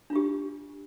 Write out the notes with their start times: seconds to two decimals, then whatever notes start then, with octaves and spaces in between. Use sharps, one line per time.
0.10 D4
0.13 F4
0.16 G4